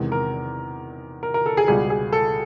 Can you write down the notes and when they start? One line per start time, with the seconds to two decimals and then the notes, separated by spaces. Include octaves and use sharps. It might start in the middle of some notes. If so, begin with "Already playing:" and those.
Already playing: E2 C3 D#3 G#3
0.12 A#4
1.23 A#4
1.34 A#4
1.46 A4
1.57 G#4
1.68 C#2 B2 G3 G#4
1.90 G#4
2.13 A4